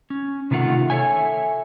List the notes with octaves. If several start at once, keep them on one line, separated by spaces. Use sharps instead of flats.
C#4
C3 D#3 A3 F4 F#5
A4 A#4 C#5 E5 G#5